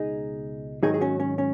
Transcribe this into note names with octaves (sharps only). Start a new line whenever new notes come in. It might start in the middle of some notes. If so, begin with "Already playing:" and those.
Already playing: C#2 B2 D#4 G#4
G#2 D#3 F#3 D#4 G#4
G#4
C#4 F#4
C#4
C#4